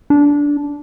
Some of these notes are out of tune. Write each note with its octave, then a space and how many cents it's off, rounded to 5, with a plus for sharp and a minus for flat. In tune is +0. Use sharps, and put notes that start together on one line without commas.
D4 -15